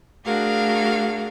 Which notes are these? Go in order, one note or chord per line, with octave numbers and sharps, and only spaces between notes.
A3 D4 F#4 G#4 A#4 F5